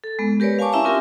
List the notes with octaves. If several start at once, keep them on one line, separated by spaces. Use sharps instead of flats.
A4
G#3 B3
G4 A#4 B4 C#5 D5
F5 G#5 A5 C#6 D6
C#4 E4 E5 G#5 A#5 C#6
C4 F4 G4 A#4